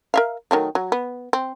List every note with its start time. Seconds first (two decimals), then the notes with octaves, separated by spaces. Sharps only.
0.14 A#4 E5 F5
0.51 D#3 F#3 A3
0.75 F#3
0.92 B3
1.33 C4